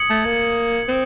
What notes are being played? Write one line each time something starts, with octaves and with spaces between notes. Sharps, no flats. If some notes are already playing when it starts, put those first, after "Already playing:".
Already playing: D#6 G#6 C#7 F#7
A3
A#3
C4